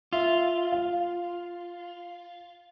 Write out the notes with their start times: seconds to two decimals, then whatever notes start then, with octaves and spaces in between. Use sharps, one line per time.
0.13 F4 E5
0.72 F5